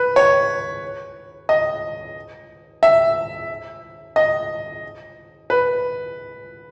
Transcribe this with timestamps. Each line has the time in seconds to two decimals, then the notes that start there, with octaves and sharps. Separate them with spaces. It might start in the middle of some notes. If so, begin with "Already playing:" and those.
Already playing: B4
0.16 C#5
1.49 D#5
2.83 E5
4.16 D#5
5.50 B4